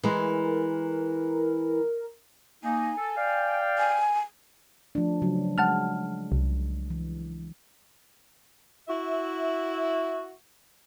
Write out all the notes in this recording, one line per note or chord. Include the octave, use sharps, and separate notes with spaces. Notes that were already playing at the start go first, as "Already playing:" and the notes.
E3 G#3 A#4
A#3 D#4 G#5
A4
D5 F5 G5
G#5
F3 A3 D4
C#3 F#3
G#3 F#5 A5 F6
C2
E3
E4 F#4 E5